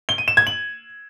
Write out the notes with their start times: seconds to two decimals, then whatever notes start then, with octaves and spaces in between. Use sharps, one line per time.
0.09 G7
0.18 D#7
0.28 E7
0.37 G#6
0.47 F#7